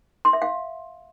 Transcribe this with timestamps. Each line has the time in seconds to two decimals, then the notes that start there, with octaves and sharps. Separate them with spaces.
0.25 C6
0.33 E5
0.42 F5